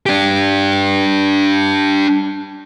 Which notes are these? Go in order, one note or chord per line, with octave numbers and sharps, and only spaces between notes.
D4 G4